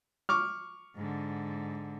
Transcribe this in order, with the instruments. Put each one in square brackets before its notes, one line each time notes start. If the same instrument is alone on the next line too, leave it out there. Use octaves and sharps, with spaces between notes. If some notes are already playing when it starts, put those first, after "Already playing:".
[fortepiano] C#6 D6 F6
[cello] G#2 D3